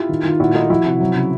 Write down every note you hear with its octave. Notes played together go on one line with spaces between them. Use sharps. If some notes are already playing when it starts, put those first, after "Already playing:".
Already playing: E4 F4 G4
D#3
D#3 F4
A#2 E4 F#4
A3 D#4 F4
F3 E4 F#4
C3
F#3
C#3